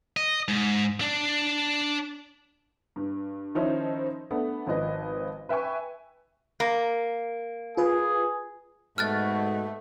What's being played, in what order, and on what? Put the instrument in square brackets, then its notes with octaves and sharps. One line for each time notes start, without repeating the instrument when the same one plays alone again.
[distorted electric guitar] D#5
G#2
D4
[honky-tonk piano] G2
D#3 F3 C#4 D#4 E4 C5
A3 B3 D4
G#1 F3 B4 D#5
B4 E5 G5 G#5 C#6
[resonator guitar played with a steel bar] A#3
[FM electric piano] F4 B4 [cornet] G#4
[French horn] G#2 [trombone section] B2 F#4 A4 [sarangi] A3 [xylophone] F6 F#6 A6